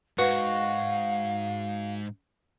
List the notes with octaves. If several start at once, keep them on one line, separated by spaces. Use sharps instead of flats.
G#2 F#4 B4 F5